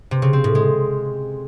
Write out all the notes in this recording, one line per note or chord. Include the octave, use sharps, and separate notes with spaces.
C3
C#3
C4
A2
G#3